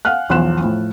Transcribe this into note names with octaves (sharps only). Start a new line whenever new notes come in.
F5 F#5 G#5 F6 F#6
B1 E2 F3 C6 F#6 E7
A2 F3